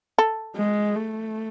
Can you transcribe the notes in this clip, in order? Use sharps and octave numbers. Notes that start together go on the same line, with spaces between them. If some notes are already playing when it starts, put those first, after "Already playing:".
A4
G#3
A3